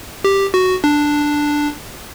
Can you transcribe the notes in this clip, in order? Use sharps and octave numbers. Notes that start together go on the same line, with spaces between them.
G4
F#4
D4